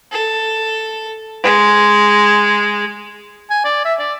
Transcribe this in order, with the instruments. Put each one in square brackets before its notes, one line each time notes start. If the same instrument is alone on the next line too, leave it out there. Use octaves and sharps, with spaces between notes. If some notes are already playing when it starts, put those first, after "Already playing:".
[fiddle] A4
G#3
[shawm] G#5
D5
E5
D5